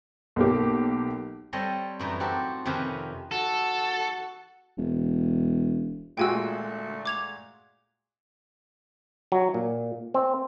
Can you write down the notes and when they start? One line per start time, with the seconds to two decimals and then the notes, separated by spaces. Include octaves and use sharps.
0.36 B1 A#3 G4
1.53 G3 C4 A4 C#5 D#5
1.99 F#2 A2 E3 D#4
2.20 C4 F#4 G4 A4
2.65 F2 C3 D#3 C#4 B4
3.32 F#4 A4
4.77 E1
6.18 A#2 G#3 A3 F#4 G5 G#5 E6
7.06 D6 G#6 F7
9.32 F#3
9.54 A#2
10.14 C4